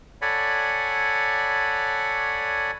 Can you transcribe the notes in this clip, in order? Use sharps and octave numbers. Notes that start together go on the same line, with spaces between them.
A4 C#5 D5 F#5 G#5 B5